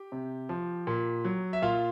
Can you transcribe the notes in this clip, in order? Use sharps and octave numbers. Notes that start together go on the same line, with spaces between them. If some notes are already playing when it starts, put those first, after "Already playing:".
Already playing: G4
C3
F3
A#2
F#3
E5
A#2 F4 F5